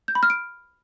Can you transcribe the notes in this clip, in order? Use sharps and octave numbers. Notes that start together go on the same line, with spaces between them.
G6
B5
F6
D7